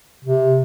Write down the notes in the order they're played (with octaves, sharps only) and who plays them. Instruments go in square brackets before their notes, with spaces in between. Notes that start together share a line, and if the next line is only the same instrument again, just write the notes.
[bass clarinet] C3